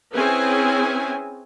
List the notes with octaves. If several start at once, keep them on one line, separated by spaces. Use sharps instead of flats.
C4 C#4 E4 G#4 B4 G#5